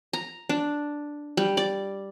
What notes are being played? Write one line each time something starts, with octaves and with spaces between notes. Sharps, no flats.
A#5
D4
G3
D5